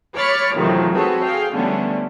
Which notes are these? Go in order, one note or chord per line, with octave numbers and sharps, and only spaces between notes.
C#5 B5 D6 F6 A6 C#7
F2 A2 C3 D#3 E3 F#3
C4 F#4 G#4 A4 B4 C#5
G#4 F5 G5
D3 F3 G3 A3 B3 C#4